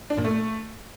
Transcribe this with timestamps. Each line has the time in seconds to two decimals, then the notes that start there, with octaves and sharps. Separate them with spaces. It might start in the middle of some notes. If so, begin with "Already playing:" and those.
0.10 D4
0.17 A#2
0.24 A3